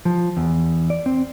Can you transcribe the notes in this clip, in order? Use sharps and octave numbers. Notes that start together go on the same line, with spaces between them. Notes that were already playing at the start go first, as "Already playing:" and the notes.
F3
E2
D5
C4